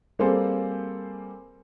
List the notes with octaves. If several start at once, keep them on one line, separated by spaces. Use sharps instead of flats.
G3 A#3 C4 G#4 A4 C5